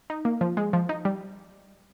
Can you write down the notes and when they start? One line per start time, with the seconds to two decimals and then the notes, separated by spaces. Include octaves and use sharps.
0.10 D#4
0.25 A#3
0.41 F3
0.57 G#3
0.73 F3
0.89 D#4
1.05 G3